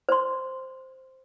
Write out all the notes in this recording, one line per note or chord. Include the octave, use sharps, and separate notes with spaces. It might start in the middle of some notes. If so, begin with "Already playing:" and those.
C5 C6